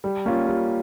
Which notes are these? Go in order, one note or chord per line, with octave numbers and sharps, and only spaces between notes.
G3
A#3 C#4 F4
G3